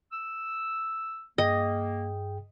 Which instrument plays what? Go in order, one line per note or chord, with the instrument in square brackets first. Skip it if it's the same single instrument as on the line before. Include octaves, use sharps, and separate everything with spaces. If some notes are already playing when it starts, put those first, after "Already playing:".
[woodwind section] E6
[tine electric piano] G2 G#4 G5 [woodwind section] A#3 [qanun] D#5